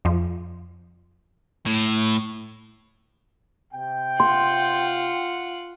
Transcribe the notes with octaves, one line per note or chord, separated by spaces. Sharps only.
F2 F3
A2
C3 G5
F4 F#5 C6